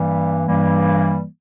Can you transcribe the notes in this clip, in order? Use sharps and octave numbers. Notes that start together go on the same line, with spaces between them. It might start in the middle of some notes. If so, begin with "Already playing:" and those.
Already playing: G2 E3 G3 A#3
G2 E3 G3 A#3